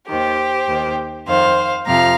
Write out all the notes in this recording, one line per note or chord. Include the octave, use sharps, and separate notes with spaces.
D#2 D#3 G4 C5
D#2 D#3
F2 D#3 C5 F5
F2 C3 F3 F5 A#5